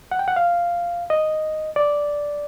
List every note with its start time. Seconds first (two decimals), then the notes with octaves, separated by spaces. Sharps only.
0.11 F#5
0.19 G5
0.28 F#5
0.36 F5
1.10 D#5
1.76 D5